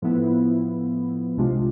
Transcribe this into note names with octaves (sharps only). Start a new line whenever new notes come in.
A2 F3 B3 E4
C2 C3 G#3 D4 F4